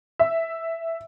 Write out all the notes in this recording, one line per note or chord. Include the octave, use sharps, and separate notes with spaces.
E5